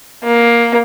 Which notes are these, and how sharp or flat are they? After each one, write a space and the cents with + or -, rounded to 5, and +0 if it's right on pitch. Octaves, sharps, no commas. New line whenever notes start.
A#3 +10